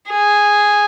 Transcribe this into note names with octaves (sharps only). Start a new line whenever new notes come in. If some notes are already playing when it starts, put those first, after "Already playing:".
G#4